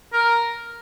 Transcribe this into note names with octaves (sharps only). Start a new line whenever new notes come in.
A#4